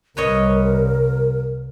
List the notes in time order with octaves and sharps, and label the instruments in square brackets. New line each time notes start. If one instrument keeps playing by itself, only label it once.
[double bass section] C2 [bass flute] A#4 [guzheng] B4 C#5 D#5